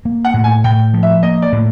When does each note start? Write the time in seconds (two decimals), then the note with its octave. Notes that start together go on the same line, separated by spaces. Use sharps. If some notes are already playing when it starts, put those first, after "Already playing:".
0.05 A#3
0.25 F#5
0.34 A2
0.44 G#5
0.64 A2 G5
0.93 F3
1.03 E5
1.23 A#3 D#5
1.42 D5
1.52 A2